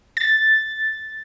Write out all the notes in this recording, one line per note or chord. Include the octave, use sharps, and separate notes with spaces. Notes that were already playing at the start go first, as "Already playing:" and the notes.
A6